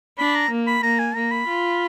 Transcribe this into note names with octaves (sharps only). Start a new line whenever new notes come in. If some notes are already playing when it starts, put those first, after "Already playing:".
D4 B5
A#5
A#3
B5
A#3 A#5
G#5
A#3 A#5
B5
F4